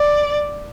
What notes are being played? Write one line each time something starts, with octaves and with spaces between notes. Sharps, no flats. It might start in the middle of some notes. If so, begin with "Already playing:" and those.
Already playing: D5